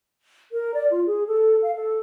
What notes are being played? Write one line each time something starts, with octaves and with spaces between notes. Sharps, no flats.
A#4
D5
F4
G#4
A4
F5
A4